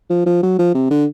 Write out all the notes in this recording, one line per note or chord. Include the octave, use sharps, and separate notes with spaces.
F3
F3
F#3
F3
C3
D3